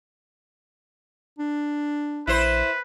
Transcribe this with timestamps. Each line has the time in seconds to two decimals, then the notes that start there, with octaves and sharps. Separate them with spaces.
1.39 D4
2.27 A#1 E4 B4 C5